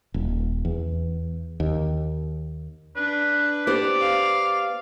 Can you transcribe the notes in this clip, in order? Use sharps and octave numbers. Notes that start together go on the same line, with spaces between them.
D#1
E2
D#2
D4 B4
B3 G4 C5 D5
F5